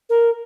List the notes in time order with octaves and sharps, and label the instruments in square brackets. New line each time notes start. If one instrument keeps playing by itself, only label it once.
[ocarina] A#4